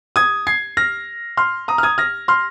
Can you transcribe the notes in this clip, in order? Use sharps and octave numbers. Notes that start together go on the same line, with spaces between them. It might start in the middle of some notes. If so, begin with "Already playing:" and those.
D#6 G#6
G#6 C7
F6 A#6
C6 F6
A#5 D#6
F6
D#6 G#6
F6 A#6
C6 F6